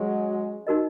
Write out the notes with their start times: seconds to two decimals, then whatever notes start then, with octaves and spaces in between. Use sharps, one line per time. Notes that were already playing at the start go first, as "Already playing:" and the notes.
Already playing: F#3 G#3 C#4
0.67 D#4 F#4 A#4 D#5